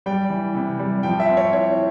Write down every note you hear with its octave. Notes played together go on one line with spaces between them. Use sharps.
G3 G5
E3
C3
G3
F3 G5
E5
C4
C#5
E4 C#5